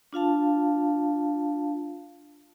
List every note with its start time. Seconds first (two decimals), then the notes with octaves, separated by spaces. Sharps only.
0.13 D4 F4 F5 A5